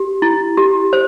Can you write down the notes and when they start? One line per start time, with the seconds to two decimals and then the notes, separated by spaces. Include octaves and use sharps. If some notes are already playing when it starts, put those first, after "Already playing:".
Already playing: G4
0.22 E4
0.57 G4
0.93 C5